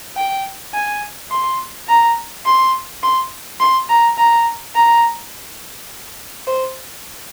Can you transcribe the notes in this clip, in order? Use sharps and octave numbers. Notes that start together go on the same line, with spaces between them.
G5
G#5
C6
A#5
C6
C6
C6
A#5
A#5
A#5
C5